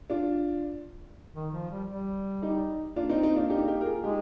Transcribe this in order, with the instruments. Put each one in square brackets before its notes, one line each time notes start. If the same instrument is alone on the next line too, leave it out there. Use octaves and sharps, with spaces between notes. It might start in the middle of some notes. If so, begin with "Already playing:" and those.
[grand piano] D4 F4
[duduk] D#3
F3
G3
G3
[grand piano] D#4 G4
[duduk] A#3 [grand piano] D4 F4
[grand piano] C4 D#4
[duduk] A#3 [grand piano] C4 D#4
[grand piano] D4 F4
D#4 G4
D#4 G4
A#4
F4 G#4
[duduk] G#3 [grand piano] D#4 G4